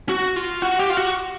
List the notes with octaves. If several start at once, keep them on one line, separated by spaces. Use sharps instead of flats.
F#4
F4
F#4
G4
F4
F#4